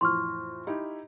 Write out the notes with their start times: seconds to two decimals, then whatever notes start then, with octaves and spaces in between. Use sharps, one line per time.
0.01 F2 A2 E3 C6 C#6 F6
0.67 D#4 E4 G4